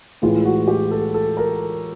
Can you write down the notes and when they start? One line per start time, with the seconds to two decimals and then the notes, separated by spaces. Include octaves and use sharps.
0.22 A2 E3 G#3 F4
0.45 F#4
0.68 G4
0.91 A4
1.14 A4
1.37 A#4